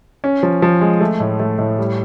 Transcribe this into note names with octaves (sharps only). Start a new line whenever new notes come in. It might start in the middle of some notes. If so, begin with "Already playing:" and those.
C#4
F3
F3
G#3
A3
A2
A3
A2
G3